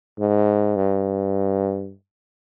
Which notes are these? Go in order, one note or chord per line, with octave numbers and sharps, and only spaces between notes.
G#2
G2